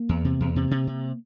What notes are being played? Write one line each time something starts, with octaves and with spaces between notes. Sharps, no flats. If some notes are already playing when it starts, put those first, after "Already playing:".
Already playing: A#3
E2
C3
E2
C3
C3
C3